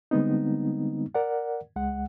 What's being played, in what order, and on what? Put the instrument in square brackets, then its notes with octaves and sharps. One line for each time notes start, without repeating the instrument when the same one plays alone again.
[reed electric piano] D3 G3 G#3 B3 C4 D#4
A#4 D5 F#5
C#2 G#3 F#5